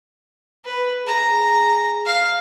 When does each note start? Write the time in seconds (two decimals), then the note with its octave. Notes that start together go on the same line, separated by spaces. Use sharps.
0.65 B4
1.07 G#4 A#5
2.06 F5